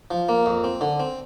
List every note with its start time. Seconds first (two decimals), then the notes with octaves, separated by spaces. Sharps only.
0.11 F3
0.29 A#3
0.46 F2
0.64 C4
0.81 D3
1.00 C4